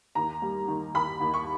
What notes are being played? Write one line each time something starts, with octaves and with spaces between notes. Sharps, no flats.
D#2 A#5
G3
D#3
D#2 B5
D#2
C#6